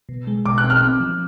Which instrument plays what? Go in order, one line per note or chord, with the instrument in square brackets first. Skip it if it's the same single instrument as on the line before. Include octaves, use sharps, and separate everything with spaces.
[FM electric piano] B2
G#3
[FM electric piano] B2 [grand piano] D6
[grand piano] F#6
[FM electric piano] C4
[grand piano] F6
[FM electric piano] C4
F3